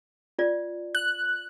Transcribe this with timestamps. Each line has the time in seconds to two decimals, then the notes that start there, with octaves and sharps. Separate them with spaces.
0.39 F4 D5
0.95 F#6